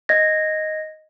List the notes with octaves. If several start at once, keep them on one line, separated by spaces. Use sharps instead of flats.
D#5 G#6 A#6